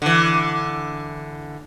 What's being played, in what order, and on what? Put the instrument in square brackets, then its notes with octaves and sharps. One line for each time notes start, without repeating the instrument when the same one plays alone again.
[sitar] D3 E3